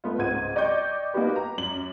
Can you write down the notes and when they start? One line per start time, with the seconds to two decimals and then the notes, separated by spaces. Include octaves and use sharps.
0.04 A3 B3 F4
0.18 C#2 G#2 C4 F#5 G#6 D#7
0.56 D5 D#5 G5 C#6 D6 G6
1.14 A#3 B3 D#4 F#4 G4 B4
1.36 A#5
1.58 F#2 F#7